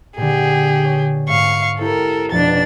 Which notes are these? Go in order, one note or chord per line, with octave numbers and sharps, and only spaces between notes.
A#2 D3 G4 G#4
C#5
G#2 F5 C#6
C4 E4 G4 A4 A#4
F1 F2 B2 D4 A6